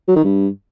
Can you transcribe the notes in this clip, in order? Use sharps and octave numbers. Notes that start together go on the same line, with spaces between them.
F#3
D#3
G2